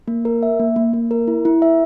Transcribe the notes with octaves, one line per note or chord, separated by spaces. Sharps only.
A#3
A#4
E5
A#3
A#3
A#3
A#4
E4
E4
E5